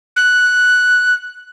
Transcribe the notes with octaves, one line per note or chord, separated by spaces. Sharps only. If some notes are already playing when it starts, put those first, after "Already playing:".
F#6